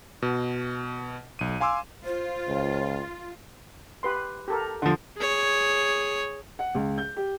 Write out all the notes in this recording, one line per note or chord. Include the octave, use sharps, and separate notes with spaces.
B2
B1 D#7
F5 G#5 C6 D6 E6
F4 C5
C#2
G4 B4 C6
G4 A4 A#4
D3 F3
G#4 C#5
F#5
C#2
G6
G4